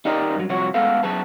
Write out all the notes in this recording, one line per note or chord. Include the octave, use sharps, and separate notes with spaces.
D#4 G4 A#4 D5 D#5
G2 F#3
C2 F3 F#4 C#5
G#3 A3 B3 A4 F5
F#3 B3 G#4 A5